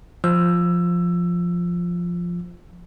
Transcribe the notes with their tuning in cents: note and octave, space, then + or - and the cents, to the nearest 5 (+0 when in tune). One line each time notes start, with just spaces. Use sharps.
F3 +0 E6 +15